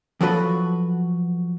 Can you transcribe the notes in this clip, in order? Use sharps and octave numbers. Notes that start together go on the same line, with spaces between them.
F3 F#3 F#4 A4 B4